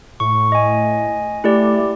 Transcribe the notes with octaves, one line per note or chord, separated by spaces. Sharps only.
A2 C#6
D#5 G#5
A3 E4 G4 D5